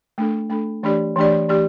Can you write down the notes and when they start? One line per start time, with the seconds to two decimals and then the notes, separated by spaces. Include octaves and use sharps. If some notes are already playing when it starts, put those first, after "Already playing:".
0.18 A3 D4 A4
0.50 A3 D4 A4
0.83 E3 A3 D4 G4 D5
1.16 E3 A3 D4 G4 D5
1.49 E3 A3 D4 G4 D5